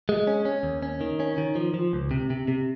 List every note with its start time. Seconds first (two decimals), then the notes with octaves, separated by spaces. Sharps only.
0.09 G#3
0.27 C#4
0.45 C#4
0.63 D#2
0.83 C#4
1.01 D#3
1.20 C#4
1.38 D#3
1.55 F3
1.74 F3
1.93 C#2
2.11 C3
2.30 C3
2.48 C3